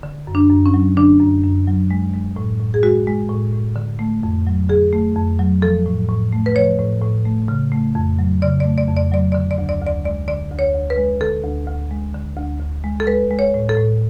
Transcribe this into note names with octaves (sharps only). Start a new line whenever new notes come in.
D3
F#2
D4
F#2
C#4
F#3
D3 D4
F#2
F#2
F#3
G#3
G#3
A2
A2
G#4
G#3 F#4
G#3
A2
A2
D3
A3
F2
F#3
D3 G#4
A3
F2
F#3
F3 A4
A2
A2
A3
B4
F3 C#5
A2
A2
A3
C#3
A3
F2
F#3
C#3 D5
D5
A3
D5
F2
D5
F#3 D5
D3 D5
D5
D2
D5
D2 D5
G#3 D5
D3 D5
D2
C#5
D2
B4
G#3
D3 A4
D2
D2
G#3
D3
D2
D2
G#3
A4
G#3 B4
G#3
C#5
A2
A4
A2